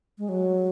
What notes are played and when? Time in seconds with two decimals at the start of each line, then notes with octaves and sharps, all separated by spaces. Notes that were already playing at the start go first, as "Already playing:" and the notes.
0.18 G#3
0.29 F#3